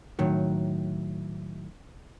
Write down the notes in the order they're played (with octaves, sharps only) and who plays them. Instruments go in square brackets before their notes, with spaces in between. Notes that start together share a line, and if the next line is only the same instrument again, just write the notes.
[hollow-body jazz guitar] A2 D#3 F#3